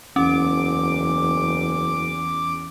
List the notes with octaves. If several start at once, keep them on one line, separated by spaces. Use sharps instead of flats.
F#1 E2 C#4 D6